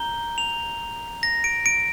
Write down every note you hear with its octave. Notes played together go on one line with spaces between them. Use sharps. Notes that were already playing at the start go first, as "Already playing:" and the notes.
Already playing: A#5 G6 G7
F7
A#6
D7
D7